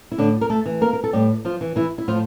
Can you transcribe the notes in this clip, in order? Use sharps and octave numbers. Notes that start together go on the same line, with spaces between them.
E4
A2 D3 D4
A#4
A3 A4
E3
A#3 A#4
A#4
A4
A2 G3 G4
F3 F4
E3
E3 E4
E4
A2 F3 F4